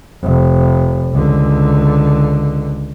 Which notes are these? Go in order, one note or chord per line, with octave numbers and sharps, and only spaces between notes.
F1
C#2 D3